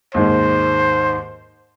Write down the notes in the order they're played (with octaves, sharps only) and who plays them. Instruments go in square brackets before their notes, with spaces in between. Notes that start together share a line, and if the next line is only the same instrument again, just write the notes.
[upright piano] D#2 G#2 D#3 [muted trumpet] C5